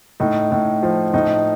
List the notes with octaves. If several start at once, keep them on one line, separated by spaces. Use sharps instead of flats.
A2 D#4
A2
F3
A2 D#4